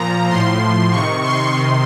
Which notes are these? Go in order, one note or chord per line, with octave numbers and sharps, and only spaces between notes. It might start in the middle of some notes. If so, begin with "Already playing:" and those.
Already playing: A#2 F3 A#5
A2 F3 C6
C3 D#3 C#6
C6
C3 D#3